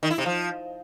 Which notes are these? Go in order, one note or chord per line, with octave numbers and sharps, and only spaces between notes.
D#3
E4
C3
F3